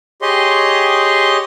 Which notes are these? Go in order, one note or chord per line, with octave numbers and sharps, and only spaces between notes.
G4 G#4 C#5 D#5 C6